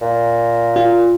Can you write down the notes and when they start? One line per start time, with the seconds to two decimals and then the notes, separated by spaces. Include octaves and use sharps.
0.01 A#2
0.76 F4